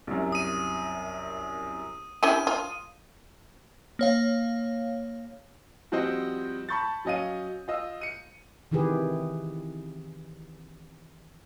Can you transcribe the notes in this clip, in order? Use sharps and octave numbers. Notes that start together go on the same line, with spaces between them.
C2 F#2
D#6 D#7
C#4 E4 G4 D#7
F4
A#3 C#5 F5
F3 G3 C4 F#4 C5 D#5
A5 B5 C#6 G6 A6
F#3 C#4 D#5 F5 D#7
F4 D#5 E6
C#7 D#7
C3 D#3 E3 G4 G#4 B4